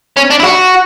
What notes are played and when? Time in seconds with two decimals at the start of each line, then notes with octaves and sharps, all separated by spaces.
0.17 C#4
0.30 D4
0.40 E4
0.44 F#4